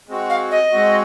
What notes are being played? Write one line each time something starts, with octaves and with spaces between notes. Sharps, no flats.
G#3 C4 F#4
F5
D#5
G#3 C4 F#4